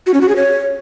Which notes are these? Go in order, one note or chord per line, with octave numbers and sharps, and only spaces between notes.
F#4
C#4
F#4
G#4
C#5